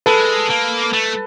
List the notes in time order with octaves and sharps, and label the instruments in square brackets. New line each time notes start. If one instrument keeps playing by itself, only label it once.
[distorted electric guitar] G#3 [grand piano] A4 B4
[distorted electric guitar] A#3
A3